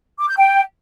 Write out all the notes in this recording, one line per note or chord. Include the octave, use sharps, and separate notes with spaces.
D6
G6
G5